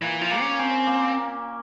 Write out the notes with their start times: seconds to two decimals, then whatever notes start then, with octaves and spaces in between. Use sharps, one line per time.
0.02 A#2 E3
0.21 F3
0.31 A#3
0.40 C#4
0.59 C4 C#4
0.87 A#3